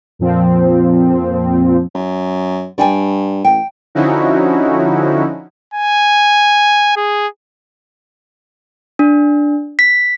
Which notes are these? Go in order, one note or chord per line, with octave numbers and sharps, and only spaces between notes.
F2 A#2 F3 C4
F#2
G2 D5 G5 G#5
A1 G5
D3 F3 C#4 D#4 E4 F#4
G#5
G#4
D4
B6